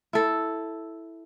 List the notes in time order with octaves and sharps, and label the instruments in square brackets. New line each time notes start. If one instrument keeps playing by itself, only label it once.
[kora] E4 A4